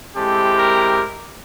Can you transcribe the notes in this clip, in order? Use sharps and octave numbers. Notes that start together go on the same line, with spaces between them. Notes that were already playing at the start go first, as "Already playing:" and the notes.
G#3 C4 E4 G4 A4
A#4